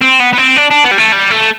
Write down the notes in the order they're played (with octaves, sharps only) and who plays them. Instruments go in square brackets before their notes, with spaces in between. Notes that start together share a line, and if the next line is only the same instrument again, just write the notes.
[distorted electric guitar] C4
B3
B3
C4
D4
D4
B3
G3
A3
G3
A3